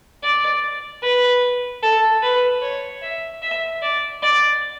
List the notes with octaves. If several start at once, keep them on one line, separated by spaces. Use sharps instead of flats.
D5
B4
A4
B4
C#5
E5
E5
D5
D5